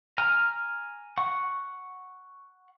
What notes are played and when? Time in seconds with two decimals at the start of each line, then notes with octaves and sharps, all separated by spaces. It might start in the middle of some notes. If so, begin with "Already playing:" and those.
0.18 G#5 A#5 F6
1.18 F#5 C#6